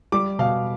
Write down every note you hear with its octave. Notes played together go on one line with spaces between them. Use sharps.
G3 D6
B2 F5